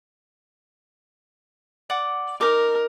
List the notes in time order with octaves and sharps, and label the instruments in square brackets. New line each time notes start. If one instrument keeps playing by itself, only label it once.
[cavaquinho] D5 F#5 D6
[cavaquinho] D#4 D6 [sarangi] A#4